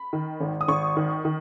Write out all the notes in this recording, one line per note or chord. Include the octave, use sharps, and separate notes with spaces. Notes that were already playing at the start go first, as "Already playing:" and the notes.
Already playing: B5
D#3
G#1
D#6
G#1 C#6
D#3
D#3